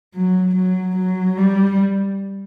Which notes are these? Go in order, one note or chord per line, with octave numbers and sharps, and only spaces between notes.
F#3
F#3
F#3
G3